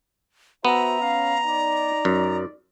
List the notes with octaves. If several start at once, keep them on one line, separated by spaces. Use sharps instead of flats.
B3 F#4 C5 E5 A#5
C#4 F5
D#4 D5
F#2